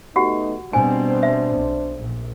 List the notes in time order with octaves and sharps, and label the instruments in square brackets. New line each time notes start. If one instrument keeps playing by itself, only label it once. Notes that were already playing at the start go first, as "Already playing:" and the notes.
[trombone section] A3 B3 D#4 [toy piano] F#4 G4 F#5
[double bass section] B2 G3 C4 [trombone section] D4 C5 [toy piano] G#5
[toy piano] E5
[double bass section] B1
A#1